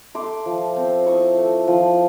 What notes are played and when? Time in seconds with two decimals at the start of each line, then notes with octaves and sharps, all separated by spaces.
0.15 A3 C6 D6
0.46 F3
0.76 C4
1.06 E4 C#6 D#6
1.37 A3
1.68 F3